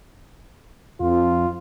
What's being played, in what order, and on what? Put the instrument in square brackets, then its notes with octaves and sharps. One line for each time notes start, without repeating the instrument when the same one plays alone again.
[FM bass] F2 [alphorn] F4